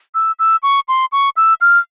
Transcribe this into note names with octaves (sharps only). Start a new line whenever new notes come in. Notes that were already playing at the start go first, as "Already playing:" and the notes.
E6
E6
C#6
C6
C#6
E6
F6